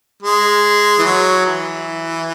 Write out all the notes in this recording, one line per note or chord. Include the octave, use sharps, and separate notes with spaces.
G#3
E3
F#3
E3